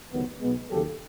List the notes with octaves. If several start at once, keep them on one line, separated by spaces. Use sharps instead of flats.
C#2 C3 D#3 F#3 B3
B1 B2 G#3 B3
D#2 C#3 F#3 G4 A4